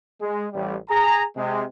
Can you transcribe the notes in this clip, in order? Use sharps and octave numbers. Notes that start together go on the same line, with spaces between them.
G#3
A1 G3
G#4 A#5
C3 G#3